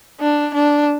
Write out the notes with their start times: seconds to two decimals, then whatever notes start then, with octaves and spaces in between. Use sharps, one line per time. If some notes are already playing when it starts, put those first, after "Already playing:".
0.20 D4
0.54 D4